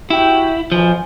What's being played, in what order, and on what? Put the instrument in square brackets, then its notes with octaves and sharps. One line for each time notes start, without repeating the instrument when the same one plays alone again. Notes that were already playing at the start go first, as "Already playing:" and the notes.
[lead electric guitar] E4 [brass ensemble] F#4 G4 G5
[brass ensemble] B1 G#5 [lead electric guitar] F3